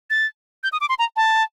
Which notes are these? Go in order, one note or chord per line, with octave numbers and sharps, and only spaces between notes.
A6
G6
D#6
D6
C6
A#5
A5